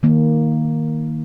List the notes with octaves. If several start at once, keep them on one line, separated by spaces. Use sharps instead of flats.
D#3 A#3